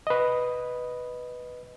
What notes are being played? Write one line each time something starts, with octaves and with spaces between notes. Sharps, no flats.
B4 D#5